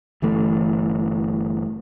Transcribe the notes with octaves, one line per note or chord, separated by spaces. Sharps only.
G1 E3 A3